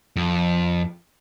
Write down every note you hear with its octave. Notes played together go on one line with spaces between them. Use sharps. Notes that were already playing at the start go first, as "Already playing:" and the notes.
F2